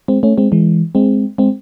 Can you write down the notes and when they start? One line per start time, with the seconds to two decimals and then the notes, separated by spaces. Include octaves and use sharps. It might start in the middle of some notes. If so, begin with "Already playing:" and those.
0.08 G#3 C4
0.23 A3 C#4
0.38 G#3 C4
0.52 E3 G#3
0.95 G#3 C4
1.38 G#3 C4